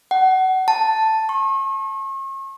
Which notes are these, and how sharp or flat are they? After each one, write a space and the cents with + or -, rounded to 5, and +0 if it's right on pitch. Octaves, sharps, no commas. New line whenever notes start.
F#5 +25
A5 +0
C#6 -40